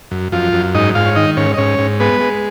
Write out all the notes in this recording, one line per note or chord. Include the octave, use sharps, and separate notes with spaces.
F#2
F#2 F3 F4
F#2
G#2 D#4 D#5
G#2 F4 F5
C#5
D#3 D#4 D#5
G#2 C#4 C#5
D#5
G#2 C#4 C#5
G#2
G#3 B3 B4
G#3